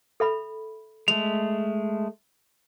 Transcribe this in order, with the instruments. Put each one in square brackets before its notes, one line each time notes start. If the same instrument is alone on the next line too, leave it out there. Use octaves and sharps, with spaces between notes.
[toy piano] A4 E5 B5
[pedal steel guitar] G#3 A3 [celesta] F7